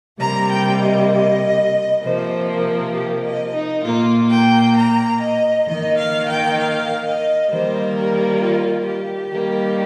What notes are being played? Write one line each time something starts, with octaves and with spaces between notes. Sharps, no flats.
C3 G3 A#3 A#5
G5
D#5
D#5
C3 F3 A#3 C5
A#4
G4
D#5
D#4
A#2 A#3 F4
G5
A#5
D#5
D#3 A#3 D#5
F5
G5
F5
D#5
D#3 G3 A#3 C5
A#4
F4
G4
D#3 G3 A#3